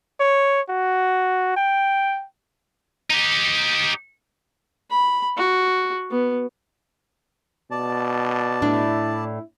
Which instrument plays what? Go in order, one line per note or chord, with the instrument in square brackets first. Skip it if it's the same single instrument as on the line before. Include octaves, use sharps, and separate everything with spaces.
[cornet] C#5
F#4
G5
[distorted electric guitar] D#4 G4
[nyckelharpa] B5
F#4
B3
[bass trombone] B2 [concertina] D5 A5
[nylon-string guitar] A2 D4 [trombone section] E4